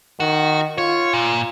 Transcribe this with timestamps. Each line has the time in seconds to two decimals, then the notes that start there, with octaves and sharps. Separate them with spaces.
0.20 D#3 F#4
0.78 F4 C#5
1.13 A#2